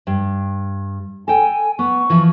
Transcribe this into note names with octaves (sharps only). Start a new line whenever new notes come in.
G2
A4 G5 G#5
B3 C#6
E3 F3